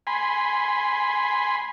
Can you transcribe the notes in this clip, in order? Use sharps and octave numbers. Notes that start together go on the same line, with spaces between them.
G#5 B5 C6